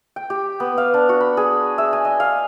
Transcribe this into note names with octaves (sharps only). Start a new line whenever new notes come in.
G5
G4
B3
F5
D4
F#4
B5
G#4
E5
G#5
D#5
F5